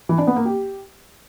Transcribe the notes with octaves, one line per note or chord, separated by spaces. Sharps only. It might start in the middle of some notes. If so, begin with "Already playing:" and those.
E3
D4
B3
A#3
G4